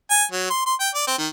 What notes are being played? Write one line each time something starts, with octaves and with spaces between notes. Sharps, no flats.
G#5
F#3
C6
C6
G5
D5
C4
D#3